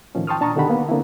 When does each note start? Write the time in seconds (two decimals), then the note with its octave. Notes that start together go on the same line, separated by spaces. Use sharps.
0.15 A2 D#3 F3 C#4
0.27 G5 A5 C6 C#6 D#6 F6
0.40 A#2 D4 A5 A#5 C#6 D#6
0.56 B2 D3 D#3 G4 F#5 B5
0.70 A#3 B3
0.89 D3 A#3 C4 E4